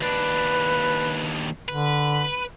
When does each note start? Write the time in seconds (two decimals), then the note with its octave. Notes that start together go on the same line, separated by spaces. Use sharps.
0.01 D#2 D4 B4
1.69 D3 B4